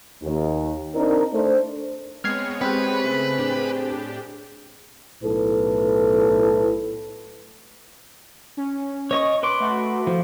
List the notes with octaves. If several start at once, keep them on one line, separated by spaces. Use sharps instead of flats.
D#2
C4 D4 D#4 A#4
A3 D4 C5
G#3 B3 C4 C#5 F6 G#6 C7
C4 G4 G#4 B4 C5 F#6
C#3 A3 G#4
A2 D4 G4
B1 A2 A4 B4
C#4
C#5 D#5 C#6
B4 C6 D6
A3 F#4
F3